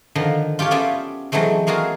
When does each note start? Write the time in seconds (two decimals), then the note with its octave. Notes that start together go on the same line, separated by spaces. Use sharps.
0.16 D3 D#3 F3
0.59 F4 G4 A4 C#5
0.71 B3 C#4 F4 D5 E5
1.32 E3 F#3 G#3 A3 C4
1.67 G#3 A#3 F4 F#4 G#4